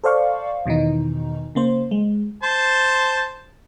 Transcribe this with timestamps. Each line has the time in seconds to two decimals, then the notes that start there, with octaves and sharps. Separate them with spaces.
0.04 A4 C5 D5 F5 C#6
0.66 E2 B2 D#3 E3 D#4
1.55 C#3 A#3 C5
1.91 G#3
2.43 C5 A5 C6